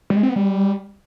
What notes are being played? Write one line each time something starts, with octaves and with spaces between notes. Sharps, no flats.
G3
G#3
C4
B3
G3